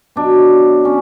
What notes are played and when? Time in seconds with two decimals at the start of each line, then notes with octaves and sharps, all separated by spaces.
0.16 B2 F#3 D4
0.85 C#4